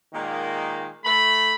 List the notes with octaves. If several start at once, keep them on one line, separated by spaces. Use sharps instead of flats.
A#2 D#3 G#3 A#3
A3 B5